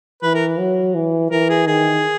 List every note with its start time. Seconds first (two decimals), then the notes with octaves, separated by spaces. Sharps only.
0.23 E3 B4
0.34 A#4
0.59 F#3
0.95 E3
1.31 E3 A#4
1.50 G#4
1.67 D#3 G#4